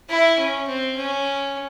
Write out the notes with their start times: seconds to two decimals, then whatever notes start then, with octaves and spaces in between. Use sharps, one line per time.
0.09 E4
0.38 C#4
0.67 C4
0.96 C#4